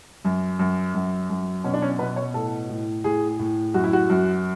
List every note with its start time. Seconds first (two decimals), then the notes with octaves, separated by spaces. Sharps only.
0.25 F#2
0.59 F#2
0.95 F#2
1.30 F#2
1.64 B2 C#4
1.74 D4
1.82 C#4
1.99 B2 B4
2.16 C#5
2.34 A2 A4
2.69 A2
3.04 A2 G#4
3.39 A2
3.74 F#2 F#4
3.84 E4
3.93 F#4
4.10 F#2